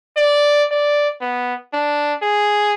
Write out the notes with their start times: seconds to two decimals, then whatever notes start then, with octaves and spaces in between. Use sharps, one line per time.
0.17 D5
0.71 D5
1.21 B3
1.74 D4
2.22 G#4